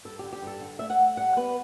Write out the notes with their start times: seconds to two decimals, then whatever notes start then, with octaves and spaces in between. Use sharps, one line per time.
0.05 G2 A4
0.19 D3 G4
0.33 G4
0.42 G2 A4
0.61 D3
0.79 A3 E5
0.90 F#5
0.99 A3
1.17 G3 F#5
1.37 B3 B4